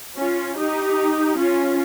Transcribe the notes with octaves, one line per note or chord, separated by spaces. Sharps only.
C#4 F4
D#4 G4
C#4 F4